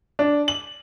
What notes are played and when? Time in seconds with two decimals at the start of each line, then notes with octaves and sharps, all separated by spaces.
0.19 D4
0.48 F#7